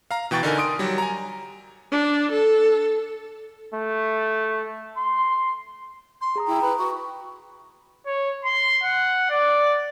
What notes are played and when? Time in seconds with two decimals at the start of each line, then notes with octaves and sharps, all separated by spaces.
0.11 F5 A#5
0.31 B2 E3 G5 C#6 A6
0.43 D3 D#4 A#4 G#5
0.58 C6 D#6 D7
0.79 F#3 G3
0.98 G#5 A#5
1.92 D4
2.32 A4
3.74 A3
4.97 C6
6.21 C6
6.36 G#4 A#5 D#6
6.47 E4 G5 A#5
6.62 B4 B5
6.79 F#4 C#6
8.06 C#5
8.45 C6
8.83 F#5
9.30 D5